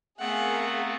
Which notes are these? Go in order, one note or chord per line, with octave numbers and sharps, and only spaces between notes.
A3 B3 C4 G#4 A#4 F5 F#5